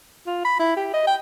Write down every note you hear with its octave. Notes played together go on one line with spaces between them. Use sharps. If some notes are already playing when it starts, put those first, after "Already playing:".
F4
B5
E4
G4
D#5
G5